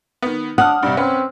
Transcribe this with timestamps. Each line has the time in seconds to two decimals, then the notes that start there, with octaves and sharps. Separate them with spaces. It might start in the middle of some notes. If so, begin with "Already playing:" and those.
0.22 D#3 B3
0.58 D4 F#5 D#6 F6
0.83 G2 C3 G3
0.97 C4 C#4 B4